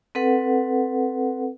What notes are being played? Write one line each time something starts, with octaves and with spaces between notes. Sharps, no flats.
C4 A4 B4 F#5